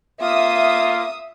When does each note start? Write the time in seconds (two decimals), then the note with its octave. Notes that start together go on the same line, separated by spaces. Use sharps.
0.21 A#3 F4 E5 D#6